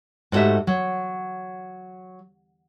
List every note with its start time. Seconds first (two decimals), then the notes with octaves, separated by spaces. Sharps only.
0.32 G#2 G3 A3 F#4 G4 E5
0.67 F#3